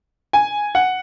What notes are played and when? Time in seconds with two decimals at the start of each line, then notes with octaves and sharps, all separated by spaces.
0.33 G#5
0.75 F#5